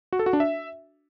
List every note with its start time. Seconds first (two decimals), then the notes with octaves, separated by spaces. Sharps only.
0.13 F#4
0.19 A4
0.26 F#4
0.33 D4
0.40 E5